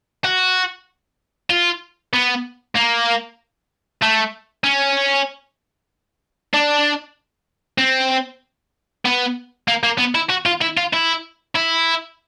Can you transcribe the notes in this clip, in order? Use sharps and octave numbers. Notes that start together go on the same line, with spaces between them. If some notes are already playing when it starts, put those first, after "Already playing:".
F#4
F4
B3
A#3
A3
C#4
D4
C4
B3
A#3
A#3
B3
E4
F#4
F4
E4
F4
E4
E4